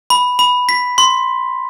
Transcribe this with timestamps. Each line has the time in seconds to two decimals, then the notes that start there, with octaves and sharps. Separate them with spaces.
0.10 B5
0.39 B5
0.69 B6
0.98 C6